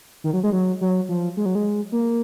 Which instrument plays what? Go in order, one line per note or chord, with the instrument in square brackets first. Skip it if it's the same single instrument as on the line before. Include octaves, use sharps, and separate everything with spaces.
[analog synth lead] D#3
F#3
G#3
F#3
F#3
F3
G#3
F#3
G#3
A#3